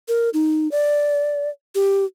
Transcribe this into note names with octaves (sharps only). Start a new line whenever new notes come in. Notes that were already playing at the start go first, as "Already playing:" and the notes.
A#4
D#4
D5
G4